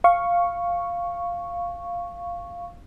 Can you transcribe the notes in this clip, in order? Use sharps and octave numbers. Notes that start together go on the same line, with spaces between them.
F5 C#6